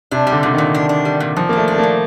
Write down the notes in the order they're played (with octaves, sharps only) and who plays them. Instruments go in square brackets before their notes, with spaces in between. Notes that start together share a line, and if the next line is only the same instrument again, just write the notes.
[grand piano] C3 [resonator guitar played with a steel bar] D4
[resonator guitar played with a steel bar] G3
[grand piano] D3
[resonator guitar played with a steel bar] A#2 [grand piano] D3
[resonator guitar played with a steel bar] A#2 [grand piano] D#3
[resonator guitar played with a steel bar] D4
D4
G3
A#2
[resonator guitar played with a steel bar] A#2 [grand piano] F3
[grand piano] A#3
[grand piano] A3 [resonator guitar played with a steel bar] D4
[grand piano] A3 [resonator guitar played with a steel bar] D4
[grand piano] A#3
[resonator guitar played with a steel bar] A#2